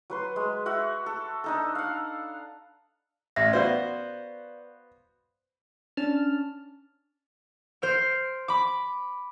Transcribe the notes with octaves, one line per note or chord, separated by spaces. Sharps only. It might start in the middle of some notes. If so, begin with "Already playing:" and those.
F#3 B4 C6
G#3
F#4 E5 F#5
A4
D4 D#4 A4
F5 F#5
A1 A#6
B3 F#4 B4 C5 D5 F5
C#4 D4 A5 F6
C5 F6 D7
B5 D6